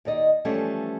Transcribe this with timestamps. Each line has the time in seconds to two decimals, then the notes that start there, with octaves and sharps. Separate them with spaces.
0.05 D#2 D#4 D5 D#5
0.45 E3 F3 G3 A3 C#4 F4